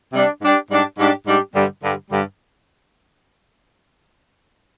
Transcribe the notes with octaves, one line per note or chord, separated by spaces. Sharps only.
C3 G3 D4 G4
G#2 G3 D4 G4
G#2 G3 D4 G4
G#2 G3 D4 G4
G#2 G3 D4 G4
G2 D3 G3
G2 D3 G3
G2 D3 G3